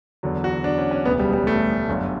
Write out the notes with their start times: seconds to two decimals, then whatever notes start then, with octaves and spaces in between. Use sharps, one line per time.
0.23 E2 D3 F#3
0.44 F#4
0.64 D4
0.78 C#4
0.91 C#4
1.05 E1 D2 C#3 B3
1.19 G3
1.33 G3
1.47 A3
1.88 G1 F#2 D3